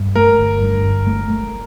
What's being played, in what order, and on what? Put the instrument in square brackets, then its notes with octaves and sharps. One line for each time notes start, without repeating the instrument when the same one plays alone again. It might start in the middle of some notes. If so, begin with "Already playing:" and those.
Already playing: [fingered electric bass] G2
[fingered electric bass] A3 [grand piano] A#4
[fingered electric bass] G1
G2
G1
A3
A3